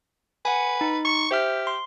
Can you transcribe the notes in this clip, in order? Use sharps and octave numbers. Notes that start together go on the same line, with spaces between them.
B4 F#5 G#5
D#4
C#6
G4 C5 E5 F6
C6